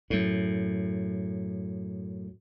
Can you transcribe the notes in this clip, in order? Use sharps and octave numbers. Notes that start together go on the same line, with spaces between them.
F#2 A2